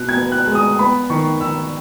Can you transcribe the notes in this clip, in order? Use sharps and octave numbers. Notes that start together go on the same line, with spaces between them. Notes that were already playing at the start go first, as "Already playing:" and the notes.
Already playing: B2 F#6
G#6
B3
F#6
G#3
D#6
B3 B5
D#3 C#6
D#3 E6